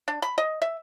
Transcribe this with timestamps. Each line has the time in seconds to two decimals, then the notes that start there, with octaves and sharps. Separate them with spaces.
0.08 D4
0.22 B5
0.38 D#5
0.62 E5